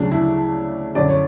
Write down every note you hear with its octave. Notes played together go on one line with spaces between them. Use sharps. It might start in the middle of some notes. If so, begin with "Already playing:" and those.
Already playing: D2 C#3 F#3 D4
E4
F#2 D3 F#3 D5
C#5